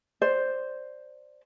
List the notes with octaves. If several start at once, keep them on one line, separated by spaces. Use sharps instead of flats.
C5 D5